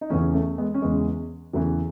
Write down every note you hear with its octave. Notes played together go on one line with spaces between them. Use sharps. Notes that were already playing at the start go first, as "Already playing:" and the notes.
D#4
E2 C#3 E3 A3 C#4
A3 C#4
G#3 B3
C#4
E2 C#3 E3 G#3 B3
E2 C#3 E3 F#3 A3